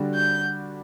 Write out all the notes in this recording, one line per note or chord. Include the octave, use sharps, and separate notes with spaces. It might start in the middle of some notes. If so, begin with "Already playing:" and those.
Already playing: D3 G3 D4 F#4
G6